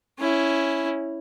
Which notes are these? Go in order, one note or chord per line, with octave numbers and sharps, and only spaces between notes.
C#4 E4